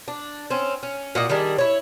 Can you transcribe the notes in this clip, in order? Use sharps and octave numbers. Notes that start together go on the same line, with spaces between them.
D4
C4 C#4
C#4
A#2 F#4 D#5
D#3 G3 D4 G#4
E4 C#5